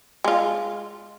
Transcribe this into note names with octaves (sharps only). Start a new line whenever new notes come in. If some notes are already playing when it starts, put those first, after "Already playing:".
G#3 F4